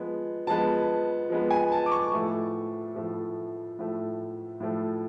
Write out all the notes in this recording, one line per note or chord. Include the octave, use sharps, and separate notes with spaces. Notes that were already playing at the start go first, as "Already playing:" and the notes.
Already playing: F3 G#3 B3
F3 G#3 B3 A5
F3 G#3 B3
G#5
A5
D6
C#6
A2 F3 A3
A2 F3 A3
A2 F3 A3
A2 F3 A3